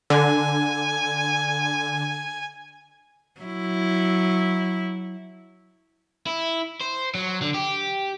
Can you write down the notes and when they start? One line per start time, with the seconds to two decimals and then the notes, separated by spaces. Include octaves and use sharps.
0.10 D3 G#5
3.41 F#3 E4
6.27 E4
6.81 C5
7.15 F#3
7.42 D3
7.54 G4